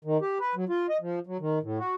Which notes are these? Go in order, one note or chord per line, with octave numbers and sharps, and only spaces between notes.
D#3
G4
B4
F#3
F4
D#5
F3
F#3
D#3
A2
F#4